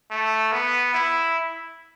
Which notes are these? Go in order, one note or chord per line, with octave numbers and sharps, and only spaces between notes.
A3
B3
E4